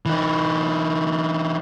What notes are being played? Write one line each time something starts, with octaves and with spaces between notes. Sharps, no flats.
E3 D#4